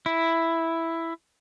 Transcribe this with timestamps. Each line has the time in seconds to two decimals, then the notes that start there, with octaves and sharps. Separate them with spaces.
0.06 E4